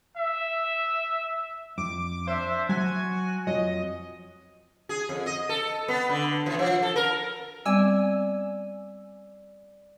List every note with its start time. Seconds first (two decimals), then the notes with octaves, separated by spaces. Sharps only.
0.17 E5
1.78 F2 D6
2.27 D4 C5 E5
2.69 F#3 F#4 G#5 A5 C6
3.47 F2 F3 F#3 D#5
4.89 G#4
5.09 F2
5.26 D#5
5.49 A4
5.88 B3
6.10 D3
6.46 E3
6.59 F3
6.82 A4
6.96 A#4
7.65 G3 B3 C4 D5 G#5 E6